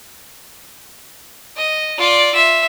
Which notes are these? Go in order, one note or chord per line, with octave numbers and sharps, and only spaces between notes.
D#5
F4 D5
F4 E5